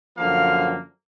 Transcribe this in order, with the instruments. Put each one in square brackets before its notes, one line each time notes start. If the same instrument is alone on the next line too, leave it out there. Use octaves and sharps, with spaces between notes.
[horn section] F#2 D3 F3 A#3 F5